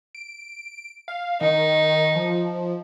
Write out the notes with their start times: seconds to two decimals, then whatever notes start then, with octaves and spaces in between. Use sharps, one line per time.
0.15 D7
1.08 F5
1.41 D#3 D#4
2.15 F3